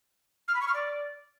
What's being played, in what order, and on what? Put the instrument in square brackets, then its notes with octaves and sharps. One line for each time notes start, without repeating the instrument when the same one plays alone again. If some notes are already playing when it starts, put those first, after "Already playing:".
[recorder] F6
B5
C#6
F6
D5